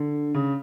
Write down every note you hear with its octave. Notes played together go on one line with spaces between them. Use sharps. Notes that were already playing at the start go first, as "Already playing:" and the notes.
Already playing: D3
C#3